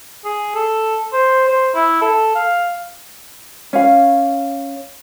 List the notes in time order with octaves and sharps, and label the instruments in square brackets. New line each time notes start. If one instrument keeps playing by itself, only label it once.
[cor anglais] G#4
A4
C5
C5
E4
A4
F5
[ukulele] C#4 F5